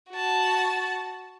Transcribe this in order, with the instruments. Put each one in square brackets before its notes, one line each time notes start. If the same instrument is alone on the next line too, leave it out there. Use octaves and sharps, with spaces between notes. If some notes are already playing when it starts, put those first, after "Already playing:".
[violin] F#4 A5